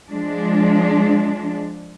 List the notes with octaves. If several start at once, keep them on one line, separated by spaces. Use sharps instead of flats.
F3 G#3 D4